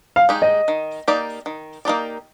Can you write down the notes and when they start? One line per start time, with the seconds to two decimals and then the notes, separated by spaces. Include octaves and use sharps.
0.16 F5
0.29 G#3 D#4 G4
0.42 D#5
0.68 D#3
1.08 A#3 D#4 G4 D5
1.46 D#3
1.85 A#3 D#4 G4 D5